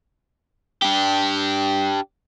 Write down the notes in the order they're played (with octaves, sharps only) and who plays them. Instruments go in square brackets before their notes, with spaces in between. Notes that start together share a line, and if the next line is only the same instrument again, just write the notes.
[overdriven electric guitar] D4 G4